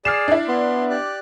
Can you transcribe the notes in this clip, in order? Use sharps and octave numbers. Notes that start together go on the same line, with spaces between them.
G#4 D5 F6 C7 E7
D4 E4
B3 C6
G4 D5 F#6